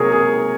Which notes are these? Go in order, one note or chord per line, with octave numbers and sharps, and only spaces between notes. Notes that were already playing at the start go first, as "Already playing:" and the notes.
Already playing: C3 F#3 A#3 G#4 A#4 C#5
G#4